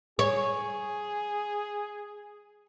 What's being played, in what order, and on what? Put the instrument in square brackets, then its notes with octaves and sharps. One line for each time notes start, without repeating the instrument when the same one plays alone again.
[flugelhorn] G#4 [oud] C#5